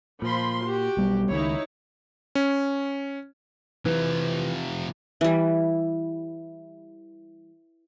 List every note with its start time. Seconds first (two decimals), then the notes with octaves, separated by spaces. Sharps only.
0.22 A#2 F3 B5 C6
0.66 F#4 G4
0.97 B1 G3 B3
1.31 C#2 D#3 D#4 E4 C#5
2.35 C#4
3.85 C3 E3 F3
5.21 E3 G3